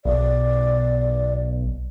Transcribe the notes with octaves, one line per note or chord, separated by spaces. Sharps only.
B1 D5